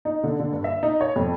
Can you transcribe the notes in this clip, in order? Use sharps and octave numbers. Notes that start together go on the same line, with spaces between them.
D#4
D3
D3
G2
E5
D#4
C#5
F2